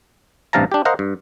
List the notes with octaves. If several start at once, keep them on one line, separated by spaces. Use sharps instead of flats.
A1 G2 C3 F5 A5 A#5
D4 G4
A#4 C5 D#5 F5 F#5
G2